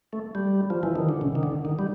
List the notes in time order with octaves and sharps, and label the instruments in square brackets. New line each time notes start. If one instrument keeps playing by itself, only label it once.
[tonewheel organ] A3
G3
F3
E3
D#3
D3
C#3
D#3
D3
D#3
G3